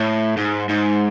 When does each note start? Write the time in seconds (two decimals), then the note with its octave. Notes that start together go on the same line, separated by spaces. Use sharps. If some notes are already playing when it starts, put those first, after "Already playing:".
Already playing: A2
0.37 G#2
0.69 G#2